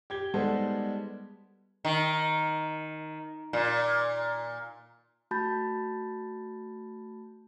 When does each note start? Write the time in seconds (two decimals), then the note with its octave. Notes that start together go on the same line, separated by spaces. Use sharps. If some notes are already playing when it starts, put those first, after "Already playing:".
0.10 G4 G#6 G7
0.34 G3 G#3 B3 D#4 A4 C5
1.85 D#3
3.53 A#2
5.31 A3 F#4 A5 B5 G6 A6